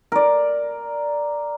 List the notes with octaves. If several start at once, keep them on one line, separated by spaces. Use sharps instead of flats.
A#4 D5